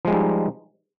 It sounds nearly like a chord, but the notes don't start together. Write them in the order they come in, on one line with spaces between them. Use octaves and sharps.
F3 G#3 G3 D#4